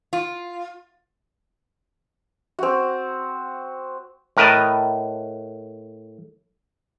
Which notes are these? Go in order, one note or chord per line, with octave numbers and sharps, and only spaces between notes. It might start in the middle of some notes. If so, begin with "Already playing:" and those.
F4
C4 F#4
A2 A#4 B4 D#5 A5